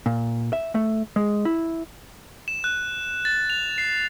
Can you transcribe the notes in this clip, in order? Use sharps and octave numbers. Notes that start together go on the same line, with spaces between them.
A#2
E5
A3
G#3
E4
E7
F#6
A6
F7
C7